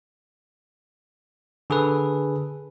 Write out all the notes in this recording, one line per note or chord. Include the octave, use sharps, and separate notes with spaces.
D3 G#4 A4 B4